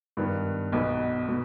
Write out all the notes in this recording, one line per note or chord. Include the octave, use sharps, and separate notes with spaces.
G2 D#3 B3
B1 B2 B3
B2